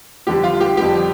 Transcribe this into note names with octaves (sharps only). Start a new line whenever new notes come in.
F2 D3 G3 G4
F4
G4
F2 D3 G3 G4